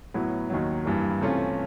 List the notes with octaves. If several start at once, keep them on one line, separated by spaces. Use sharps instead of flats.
A2 F#3 B3 E4
D#2 D#3 F#3
G2 E3 G3 A#3
C3 E3 A3 C#4 F4